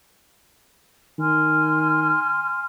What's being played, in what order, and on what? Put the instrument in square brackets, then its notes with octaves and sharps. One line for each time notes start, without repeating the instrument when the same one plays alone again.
[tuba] D#3 [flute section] G#5 C6 F6